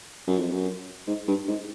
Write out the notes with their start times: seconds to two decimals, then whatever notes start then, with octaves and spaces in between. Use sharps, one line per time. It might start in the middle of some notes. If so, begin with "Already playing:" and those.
0.27 F#2
0.39 F2
0.51 F#2
1.07 G#2
1.27 G2
1.48 G#2